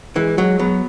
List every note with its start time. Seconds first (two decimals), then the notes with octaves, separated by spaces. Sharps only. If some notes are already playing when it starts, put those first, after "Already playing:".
0.16 E3 G#3
0.38 F#3 G#3
0.59 F#3 B3